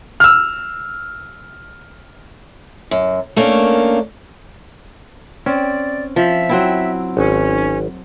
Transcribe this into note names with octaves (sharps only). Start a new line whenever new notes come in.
E6 F6
F#2
A3 A#3 C#4 D4
C4 C#4 D5
F3 E5
F#3 C4 E4
G#1 C#4